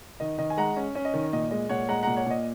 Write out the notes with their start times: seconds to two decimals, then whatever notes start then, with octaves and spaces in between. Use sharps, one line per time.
0.20 D#3 D#5
0.38 D#3 D#5
0.50 G#5
0.57 G#3 F#5 A#5
0.77 C#4
0.95 C#4
1.05 D#5
1.14 D#3
1.33 A#2 D#5
1.51 G#3 D#5
1.69 A#2 C#5 F#5
1.89 G#3 F#5 A#5
2.03 A#2 F#5 A#5
2.17 C#5 F#5
2.27 A#2 D#5